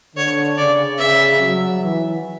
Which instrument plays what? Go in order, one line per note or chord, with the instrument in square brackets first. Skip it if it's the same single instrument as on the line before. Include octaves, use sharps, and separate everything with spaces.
[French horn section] D3 [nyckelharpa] C#5
[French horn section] C#3 [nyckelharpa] D5
[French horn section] C#3 [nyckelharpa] E5
[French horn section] F#3
E3